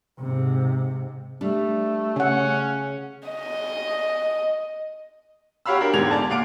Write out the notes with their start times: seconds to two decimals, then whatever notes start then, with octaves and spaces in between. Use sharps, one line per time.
0.19 G#2 C3
1.41 G3 A3 D4
2.16 C#3 C#4 F#5
3.28 D#5
5.66 F#4 G4 C#5 F5 B5 E6
5.80 D4 G4 A#4
5.93 E2 G#2 D3 G#6 F7
6.11 D5 A5
6.30 A#2 F5 F#5 D6 D7